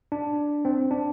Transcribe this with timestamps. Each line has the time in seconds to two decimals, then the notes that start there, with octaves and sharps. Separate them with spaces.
0.12 D4
0.65 C4
0.91 D4